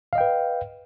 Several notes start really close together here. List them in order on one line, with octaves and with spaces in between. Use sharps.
F5 D#5 G5 B4